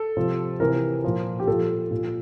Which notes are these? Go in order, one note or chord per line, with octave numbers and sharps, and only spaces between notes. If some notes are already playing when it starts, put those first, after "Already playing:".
Already playing: A4
C3 F3
C3 E3 A#4
A#2 F3
G4
A#2 F3 A4
A#2 F3